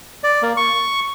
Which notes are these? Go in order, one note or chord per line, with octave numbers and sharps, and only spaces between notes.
D5
A#3
C#6